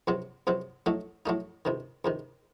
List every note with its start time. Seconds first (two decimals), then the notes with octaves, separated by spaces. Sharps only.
0.07 C#2 C3 F#3 C4
0.47 C#2 C3 F#3 C4
0.86 A2 F#3 A3 D#4
1.26 A2 F#3 A3 D#4
1.65 C#2 C3 D#3
2.05 C#2 C3 D#3